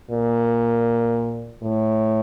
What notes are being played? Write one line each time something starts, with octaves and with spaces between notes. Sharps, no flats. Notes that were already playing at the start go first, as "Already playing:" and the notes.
A#2
A2